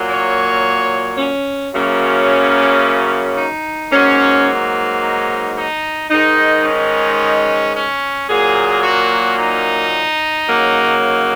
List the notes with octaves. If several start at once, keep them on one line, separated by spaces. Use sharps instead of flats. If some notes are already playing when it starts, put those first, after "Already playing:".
Already playing: A#2 F#3 A#3
C#5
C#4
F#2 C#3 F#3 A#3 C#4
D#4
G#2 F#3 A#3 C#4
D#4
D#4
G#2 D#3 G#3 D#4
C#4
C#4
A#2 F#3 A#3 G#4
F#4
D#4
C#3 F#3 A#3
D#4